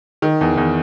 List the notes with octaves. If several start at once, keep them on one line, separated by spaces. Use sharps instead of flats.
D#3
E2
E2